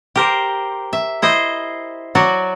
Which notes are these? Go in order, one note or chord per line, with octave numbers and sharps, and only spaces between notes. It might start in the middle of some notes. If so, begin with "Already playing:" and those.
G4 A#4 C5
E5
E4 C5 D#5
F#3 F#4 D5